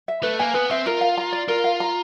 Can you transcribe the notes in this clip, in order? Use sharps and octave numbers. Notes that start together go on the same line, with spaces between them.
E5
A3 B4
A#3 G#5
B3 B4
C4 E5
F4 A#4
F5
A#5
D5
F4 A#4
F5
A#5